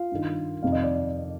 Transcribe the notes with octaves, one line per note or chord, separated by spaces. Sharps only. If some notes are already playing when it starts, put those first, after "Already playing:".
Already playing: F4 F5
G2 D#3
F2 C3 D#3 F5
D#5
D5